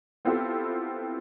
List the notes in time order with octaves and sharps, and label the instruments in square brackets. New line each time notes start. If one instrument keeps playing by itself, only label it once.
[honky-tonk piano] B3 C4 E4 F4 G4 A4